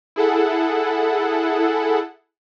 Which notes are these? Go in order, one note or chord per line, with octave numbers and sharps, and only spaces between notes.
E4 G#4 A4 F#5